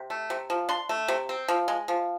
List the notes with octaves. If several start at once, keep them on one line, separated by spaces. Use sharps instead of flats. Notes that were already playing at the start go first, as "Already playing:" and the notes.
Already playing: C3
A3
C3
F3
D4 C6
A3
C3
C4
F3
G#3
F3